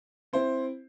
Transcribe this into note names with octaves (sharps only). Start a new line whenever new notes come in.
C4 E4 C5